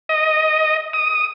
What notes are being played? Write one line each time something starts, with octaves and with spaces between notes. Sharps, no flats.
D#5
D#6